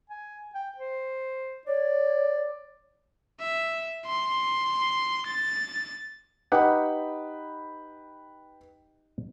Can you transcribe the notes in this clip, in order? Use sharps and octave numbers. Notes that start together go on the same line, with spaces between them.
G#5
G5
C5
C#5 D5
E5
C6
A6
D#4 G4 B4 F#5 G5 B5